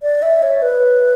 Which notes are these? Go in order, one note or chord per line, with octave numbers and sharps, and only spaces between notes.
D5
E5
C#5
B4